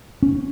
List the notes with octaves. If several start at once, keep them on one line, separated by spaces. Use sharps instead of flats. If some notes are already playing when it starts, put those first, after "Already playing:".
C#4